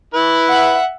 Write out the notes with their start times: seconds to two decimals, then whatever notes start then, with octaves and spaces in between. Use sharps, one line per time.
0.14 E4 B4
0.49 E5 F#5